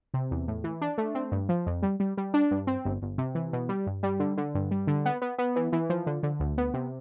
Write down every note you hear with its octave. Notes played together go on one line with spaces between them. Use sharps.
C3
E2
A2
E3
D4
A3
C4
G2
F3
F2
G3
G3
G3
D4
G2
C4
G1
G1
C3
E3
B2
G3
G2
G3
D3
D3
G2
G3
D3
B3
B3
B3
E3
E3
F3
D3
D3
D2
B3
C3